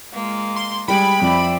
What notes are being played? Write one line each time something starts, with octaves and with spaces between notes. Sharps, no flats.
G#3 A#3 F4
C6
G3 G#3 G5 B5 G#6
F2 C5 D5 E5